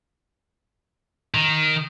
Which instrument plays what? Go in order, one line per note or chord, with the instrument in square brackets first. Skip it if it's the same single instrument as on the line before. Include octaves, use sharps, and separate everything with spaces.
[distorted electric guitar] D#3